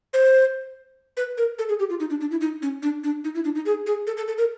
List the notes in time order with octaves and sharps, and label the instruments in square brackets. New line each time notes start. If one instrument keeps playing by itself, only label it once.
[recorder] C5
B4
A#4
A4
G#4
G4
F4
D#4
D4
D4
E4
D#4
C#4
D4
D4
D#4
E4
D4
D#4
G#4
G#4
A4
A4
A4
A#4